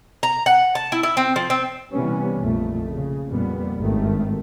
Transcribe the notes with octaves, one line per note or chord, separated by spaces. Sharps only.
A#5
F#5
A5
E4
E4
C4
F3
C4
C3 E3 G3 B3 C#4
A#1 F2 A3
C#3
F2 A#2 G3 B3
G#1 G2 D#3 A3